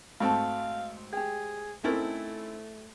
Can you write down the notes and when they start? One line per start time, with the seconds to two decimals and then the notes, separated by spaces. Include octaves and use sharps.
0.20 G#2 A3 C4 F#4 F5 A5
1.13 G4 G#4 G5
1.84 A3 C4 C#4 D#4 E4 A4 A#4